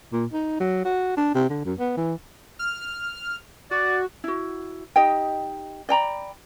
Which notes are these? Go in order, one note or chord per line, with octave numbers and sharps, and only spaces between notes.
A#2
D#4
F#3
F#4
D4
C3
D3
F#2
B3
E3
F6
F#4 D5
E4 F#4
D#4 G4 D#5 G5
D5 G5 A#5 B5